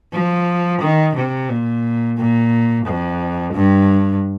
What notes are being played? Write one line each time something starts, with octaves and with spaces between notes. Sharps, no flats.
F3
D#3
C3
A#2
A#2
F2
G2